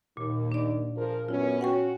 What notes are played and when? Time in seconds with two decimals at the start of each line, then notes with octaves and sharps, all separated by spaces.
0.17 D#2 A#2
0.52 D4 D5
0.96 F3 G#4 A#4
1.29 F#2 B3 C#4 E4 F4
1.61 C#4 F#4 F#5 G5 C#6